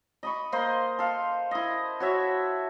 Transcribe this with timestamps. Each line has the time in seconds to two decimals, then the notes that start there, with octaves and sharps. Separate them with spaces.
0.23 D#5 B5 C#6
0.52 A#3 C5 D#5 C6
0.99 A4 F5
1.51 E4 D#5
2.00 F#4 C#5 E5